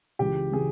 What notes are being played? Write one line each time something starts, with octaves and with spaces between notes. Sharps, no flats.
C#2 C#3 E3 G4
C#3 E3 G#4